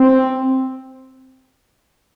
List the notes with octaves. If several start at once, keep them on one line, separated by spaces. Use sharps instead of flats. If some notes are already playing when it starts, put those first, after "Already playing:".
Already playing: C4